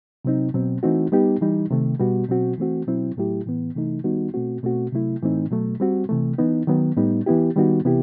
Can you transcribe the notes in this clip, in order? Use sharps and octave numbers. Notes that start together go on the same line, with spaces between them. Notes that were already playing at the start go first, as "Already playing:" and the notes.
C3 F#3 C4 D#4
B2 F#3 C4
E3 A3 C4 D#4 F#4
G3 B3 D#4 G4
E3 G3 D#4
C3 D#3 A3
B2 G3 B3 F#4
B2 F#3 C4 F#4
E3 A3 C4 F#4
B2 F#3 C4 E4
A2 F#3 A3 E4 G4
A2 E3 B3
C3 E3 A3 D#4
D#3 G3 B3 D#4 F#4
B2 A3 C4 F#4
B2 A3 C4 F#4
C3 F#3 A3 E4
A2 E3 A3 C4 D#4
B2 F#3 A3
G3 C4 F#4
C3 E3 A3
E3 B3 D#4
D#3 F#3 B3
A2 G3 B3 D#4
E3 B3 E4 G4
D#3 G3 B3 D#4 F#4
C3 E3 B3 E4 G4